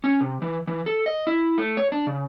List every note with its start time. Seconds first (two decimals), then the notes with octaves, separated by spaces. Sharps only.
0.04 C#4
0.21 C3
0.42 E3
0.67 E3
0.86 A4
1.06 D#5
1.27 E4
1.58 A3
1.77 C#5
1.92 D4
2.07 C#3